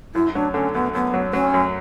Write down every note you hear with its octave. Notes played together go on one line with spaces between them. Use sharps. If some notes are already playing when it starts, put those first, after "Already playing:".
F#2 E4
F#3 D4
D3 C#4
F#2 B3
F#2 B3
F#3
F#3 C#4
F#2